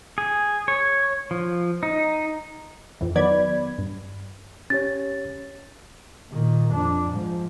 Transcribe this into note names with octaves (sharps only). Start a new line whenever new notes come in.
G#4
C#5
F3
D#4
F2 E3
D#3 F#3 B3 D5 B5 G#6
G2
C#4 G4 C#5 A6
A#2 D#3
F2 D4
G#2 F3